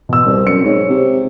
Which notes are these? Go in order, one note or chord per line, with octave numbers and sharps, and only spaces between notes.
B2 E6
C2
F#2 C#7
G#2 C#5
C3